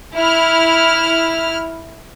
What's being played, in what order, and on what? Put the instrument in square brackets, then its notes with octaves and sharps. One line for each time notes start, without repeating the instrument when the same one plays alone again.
[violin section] E4 F6